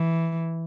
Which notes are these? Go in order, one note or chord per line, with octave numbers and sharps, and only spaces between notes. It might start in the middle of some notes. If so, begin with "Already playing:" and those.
Already playing: E3